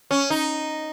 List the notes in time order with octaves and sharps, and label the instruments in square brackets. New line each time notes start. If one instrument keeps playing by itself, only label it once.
[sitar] C#4
D#4